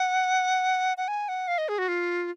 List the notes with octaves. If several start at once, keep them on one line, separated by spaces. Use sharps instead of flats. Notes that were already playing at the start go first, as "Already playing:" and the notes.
Already playing: F#5
F#5
G#5
F#5
F5
D#5
G#4
F#4
F4